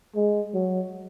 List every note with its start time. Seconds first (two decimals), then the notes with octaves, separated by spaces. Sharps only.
0.15 G#3
0.54 F#3